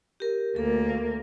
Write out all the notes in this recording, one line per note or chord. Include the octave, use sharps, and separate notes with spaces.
G4 A#4
D2 A#3 A4